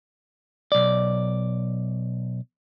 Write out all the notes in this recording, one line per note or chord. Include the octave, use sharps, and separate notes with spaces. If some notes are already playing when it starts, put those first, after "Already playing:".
B1 D5